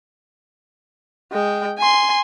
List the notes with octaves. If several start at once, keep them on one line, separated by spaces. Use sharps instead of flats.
G#3 G5
G#5 C6